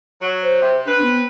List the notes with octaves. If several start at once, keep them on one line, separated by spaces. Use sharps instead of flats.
F#3
C5
C3
C4 D4 B4
B3